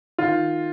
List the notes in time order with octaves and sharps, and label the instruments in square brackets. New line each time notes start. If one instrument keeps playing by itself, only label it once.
[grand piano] D#3 F4